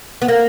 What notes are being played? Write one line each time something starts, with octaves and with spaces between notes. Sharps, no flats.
B3
A#3